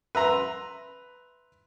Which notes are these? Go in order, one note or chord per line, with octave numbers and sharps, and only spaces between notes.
B4 E5 A#5 C6